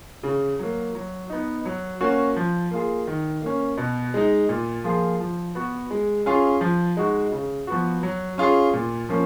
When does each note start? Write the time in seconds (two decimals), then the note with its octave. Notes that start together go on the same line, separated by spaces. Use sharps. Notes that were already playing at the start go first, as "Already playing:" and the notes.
0.23 C#3
0.59 F#3 A#3
0.95 F#3
1.30 B3 D#4
1.65 F#3
2.01 A#3 C#4 F#4
2.36 F3
2.71 A#3 F4 G#4
3.07 D#3
3.42 A#3 C#4
3.77 B2
4.14 G#3 D#4
4.49 A#2
4.84 F3 A#3 F4 G#4
5.20 F3
5.55 B3 F#4
5.91 G#3
6.26 C#4 F4 G#4
6.61 F3
6.97 G#3 D#4 F#4
7.32 C#3
7.67 F3 B3 F#4
8.03 F#3
8.38 C#4 F4 G#4
8.73 A#2
9.09 F3 A#3 C#4